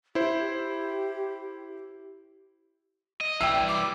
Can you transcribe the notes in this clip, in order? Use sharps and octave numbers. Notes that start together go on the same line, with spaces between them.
E4 G4 C5
D#5
E3 G3 E5 G5 E6
D6